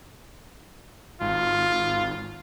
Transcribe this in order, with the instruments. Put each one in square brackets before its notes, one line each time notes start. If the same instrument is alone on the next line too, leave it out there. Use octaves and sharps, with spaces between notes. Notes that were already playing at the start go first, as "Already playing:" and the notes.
[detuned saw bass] G#1 [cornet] F4